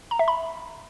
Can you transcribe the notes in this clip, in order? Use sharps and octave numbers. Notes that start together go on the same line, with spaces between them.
A#5
E5
B5